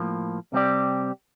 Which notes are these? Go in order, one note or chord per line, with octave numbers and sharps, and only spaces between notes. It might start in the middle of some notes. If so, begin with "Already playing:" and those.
Already playing: A2 F3 A#3
C3 G3 C4 G4 D5